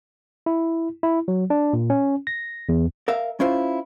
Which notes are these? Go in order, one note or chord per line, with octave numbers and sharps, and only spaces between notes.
E4
E4
F#3
D4
A#2
C#4
A#6
E2
A#4 E5 F5
C#4 E4 F4 C5